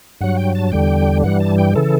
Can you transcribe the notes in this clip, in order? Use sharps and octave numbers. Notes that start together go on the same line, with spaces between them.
G2 F#3 F#5
G5
A5
E2 D3 G3 G5
G2 E3 G3 F#5
A5
G5
C#3 E3 A4